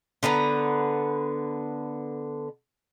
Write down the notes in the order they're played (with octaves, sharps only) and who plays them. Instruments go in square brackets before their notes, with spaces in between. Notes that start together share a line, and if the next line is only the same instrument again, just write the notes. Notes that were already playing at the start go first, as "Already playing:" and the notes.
[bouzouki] D3 B3 B4 A#5